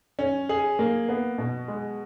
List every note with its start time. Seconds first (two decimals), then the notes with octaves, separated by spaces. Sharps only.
0.19 C#4
0.49 G#4
0.79 A#3
1.09 B3
1.38 B2
1.68 G#3